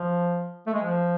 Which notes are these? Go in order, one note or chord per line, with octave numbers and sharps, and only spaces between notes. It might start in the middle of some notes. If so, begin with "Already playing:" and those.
Already playing: F3
A3
G#3
F3